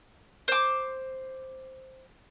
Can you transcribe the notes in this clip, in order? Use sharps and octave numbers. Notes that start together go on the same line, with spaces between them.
C5 D6